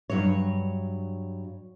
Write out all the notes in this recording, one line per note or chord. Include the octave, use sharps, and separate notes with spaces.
G2 F#3 C#5